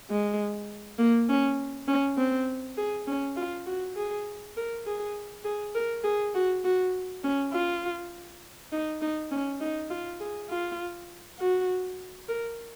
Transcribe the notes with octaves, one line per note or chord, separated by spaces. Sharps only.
G#3
A#3
C#4
C#4
C4
G#4
C#4
F4
F#4
G#4
A#4
G#4
G#4
A#4
G#4
F#4
F#4
C#4
F4
D#4
D#4
C#4
D#4
F4
G#4
F4
F#4
A#4